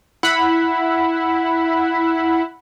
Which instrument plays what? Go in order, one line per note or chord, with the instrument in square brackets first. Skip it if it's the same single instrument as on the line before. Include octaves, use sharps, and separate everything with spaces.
[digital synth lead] E4 [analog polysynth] F#5 B5